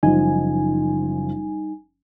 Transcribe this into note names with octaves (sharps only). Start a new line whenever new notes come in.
F#1 F3 G3 D#4 G#5